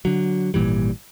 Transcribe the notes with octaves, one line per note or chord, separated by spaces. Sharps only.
D3 F#3
G#1 A#2 E3 G3